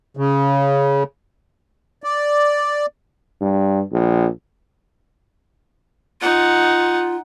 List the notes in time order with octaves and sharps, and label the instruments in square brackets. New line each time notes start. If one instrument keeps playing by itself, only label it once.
[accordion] C#3
D5
[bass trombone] G2
A#1
[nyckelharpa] D#4 F#5 [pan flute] F4